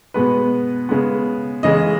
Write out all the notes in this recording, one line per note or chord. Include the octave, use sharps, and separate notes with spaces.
B2 G#3 B3 B4
C#3 G#3 B3
C#3 E3 G#3 D#5